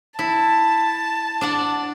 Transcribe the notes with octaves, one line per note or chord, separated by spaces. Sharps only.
E4 A5
D4 D5 F#5